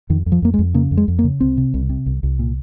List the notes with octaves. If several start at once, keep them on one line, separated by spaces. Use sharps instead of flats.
F2 D#3
F2
F3
F2 A#3
G#3
F2
C#3 A#3
F2
G#3
F2
A#3
C#3
C2 C4
C3
C2
C3
C2
C2
A#2